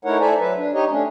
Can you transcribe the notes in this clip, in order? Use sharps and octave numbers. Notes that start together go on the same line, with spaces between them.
A3 D#4 E4 A#4 C#5 F#5
A4 C5 D5 E5 G#5 A#5
F#3 B4 E5
D4
D#4 G4 C#5 D#5
A3 C#4 D4